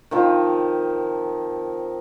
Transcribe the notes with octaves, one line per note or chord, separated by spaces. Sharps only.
D#3 F3 C4